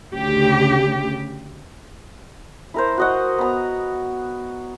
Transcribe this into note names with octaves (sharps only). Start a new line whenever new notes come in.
D2 C#3 G4
E4 A#4 C5
F#4 D#5 F#5
B3 A#5